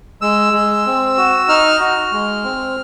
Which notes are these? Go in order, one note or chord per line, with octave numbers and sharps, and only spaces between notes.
G#3 E6
G#3
C4
F#4
D#4 F6
F#4
G#3
C4